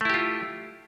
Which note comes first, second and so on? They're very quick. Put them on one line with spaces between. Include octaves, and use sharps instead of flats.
A3 E4 G4 F4